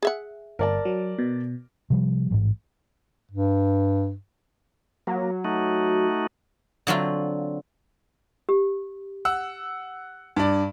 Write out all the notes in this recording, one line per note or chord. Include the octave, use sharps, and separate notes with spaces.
G#4 E5 F#5
G1 A#4 D5 A5
F#3
B2
C3 F3 G3
A1 G#2
G2
F#3 A#3
A3 D#4 F#4
D3 F#3 C4 F4
G4
F#5 E6
G2 D5